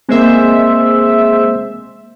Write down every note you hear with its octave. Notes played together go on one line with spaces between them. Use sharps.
G#3 A#3 C4 C5 E5